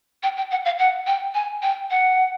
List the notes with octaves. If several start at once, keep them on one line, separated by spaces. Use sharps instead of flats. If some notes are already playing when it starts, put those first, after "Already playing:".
G5
G5
F#5
F5
F#5
G5
G#5
G5
F#5